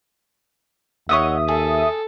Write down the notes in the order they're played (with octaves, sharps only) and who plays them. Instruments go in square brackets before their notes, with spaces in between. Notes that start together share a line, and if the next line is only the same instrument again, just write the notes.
[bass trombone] D#2 [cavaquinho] C#5 D#5 F#5 [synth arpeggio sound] E5 D#6
[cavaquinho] G#4 [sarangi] A4